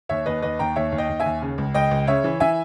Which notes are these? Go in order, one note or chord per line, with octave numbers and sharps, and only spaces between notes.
D#2 C#5 E5
D#2 B4 D#5
D#2 B4 D#5
D#2 G5 A#5
D#2 C#5 E5
D#2
D#5 G5
D#2
E5 G#5
D#2
C#3
C#2
C#2 D#5 G5
C#2
C#3 C#5 E5
E3
E3 E5 G#5